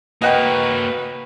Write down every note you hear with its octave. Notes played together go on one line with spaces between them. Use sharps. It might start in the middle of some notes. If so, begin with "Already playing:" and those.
A#3 F#4 B4 D#5 F#5 G5